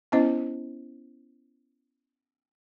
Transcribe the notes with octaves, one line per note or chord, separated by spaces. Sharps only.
B3 C#4 E4 C5 D#5